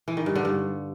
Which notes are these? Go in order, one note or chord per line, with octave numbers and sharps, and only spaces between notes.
E3
D#3
G2
D3
G2